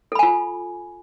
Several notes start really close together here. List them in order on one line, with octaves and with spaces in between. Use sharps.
A4 B5 G#5 F4